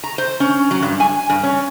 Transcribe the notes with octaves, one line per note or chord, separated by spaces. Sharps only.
A#5
C5
C#4
F#3
G2
G#5
G2
C#4